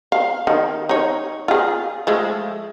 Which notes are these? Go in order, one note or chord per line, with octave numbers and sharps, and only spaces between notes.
F5
D#3
D#4 C#5
F4 G#4
F3 G#3 A3